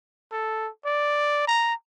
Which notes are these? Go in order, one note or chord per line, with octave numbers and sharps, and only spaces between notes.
A4
D5
A#5